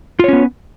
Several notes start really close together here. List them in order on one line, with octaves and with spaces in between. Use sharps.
F4 C#5 C#4 B3